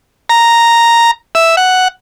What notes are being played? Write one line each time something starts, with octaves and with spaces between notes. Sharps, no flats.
A#5
E5
F#5